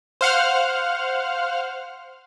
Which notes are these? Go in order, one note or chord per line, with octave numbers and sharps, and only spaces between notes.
C5 F5 F#5 F6